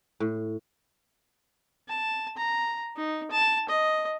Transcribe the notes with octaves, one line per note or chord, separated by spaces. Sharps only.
A2
A5
A#5
D#4
A5
D#5